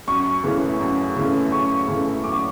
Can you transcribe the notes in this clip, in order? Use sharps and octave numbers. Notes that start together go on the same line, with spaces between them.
F#2 C#6
C#3 E3 A3 C#4
F#2
C#3 E3 A3 C#4
F#2 C#6
C#3 E3 A3 C#4
F#2 D6
C#6